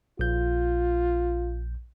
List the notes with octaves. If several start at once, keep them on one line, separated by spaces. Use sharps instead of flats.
A#1 F4 G6